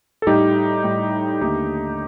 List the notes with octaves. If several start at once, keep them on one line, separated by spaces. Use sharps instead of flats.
A4
A2 G3 D#4 G4
A2 G3
D#2 D3 A3 D#4 G4